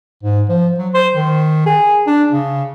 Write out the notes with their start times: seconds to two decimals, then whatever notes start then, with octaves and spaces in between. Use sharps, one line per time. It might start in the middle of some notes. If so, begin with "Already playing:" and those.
0.23 G#2
0.49 F3
0.78 F#3
0.94 C5
1.15 D#3
1.66 G#4
2.07 D4
2.31 C#3